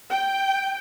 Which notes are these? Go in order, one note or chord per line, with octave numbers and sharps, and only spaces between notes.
G5